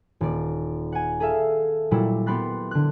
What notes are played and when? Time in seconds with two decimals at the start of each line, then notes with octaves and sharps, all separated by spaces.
0.21 D#1 D5
0.92 F#5 G#5
1.20 G#4 A4 E5 F5
1.91 A#2 F#3 G3 E4
2.26 B3 G4 B5 C6 F#6 A6
2.71 D3 F#6